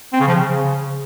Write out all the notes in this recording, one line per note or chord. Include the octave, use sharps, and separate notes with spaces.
C4
C#3
F3
C#3